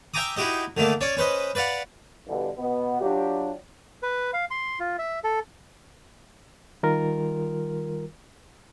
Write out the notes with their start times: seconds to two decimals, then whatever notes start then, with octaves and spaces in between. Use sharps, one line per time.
0.14 E5 G5 G#5 A#5 D6 D#6
0.37 D#4 E4 F#4 G4 D#5
0.77 D3 D#3 A3 A#3
1.01 C#4 C#5 D5
1.17 C#4 B4 C5 D#5
1.55 B4 D5 F5 F#5
2.28 G2 B2 D3 E3 G3
2.58 B2 B3
3.01 F#3 D4 F4 G4
4.03 B4
4.33 F5
4.51 C6
4.80 F4
4.99 E5
5.24 A4
6.83 D#3 G3 F4 A#4